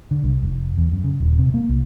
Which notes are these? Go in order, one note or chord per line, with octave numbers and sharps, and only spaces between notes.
D3
C2
F1
E2
F#2
C#3
D#1
C3
A#3
C2